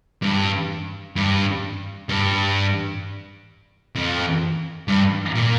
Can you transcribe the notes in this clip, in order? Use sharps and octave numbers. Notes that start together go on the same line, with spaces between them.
G2
G2
G2
F2
G2
A#2